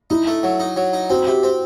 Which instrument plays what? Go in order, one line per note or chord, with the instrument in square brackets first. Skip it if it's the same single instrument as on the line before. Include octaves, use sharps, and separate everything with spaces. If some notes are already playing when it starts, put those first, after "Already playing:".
[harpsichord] D#4 [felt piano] E4
[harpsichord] A3
F#3
D#4
F#3
D#4
[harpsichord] C4 [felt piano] F#4
[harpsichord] C3
C4